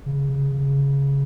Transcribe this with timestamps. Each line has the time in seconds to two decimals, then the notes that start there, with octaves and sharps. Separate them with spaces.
0.06 C#3
0.29 C#3
0.52 C#3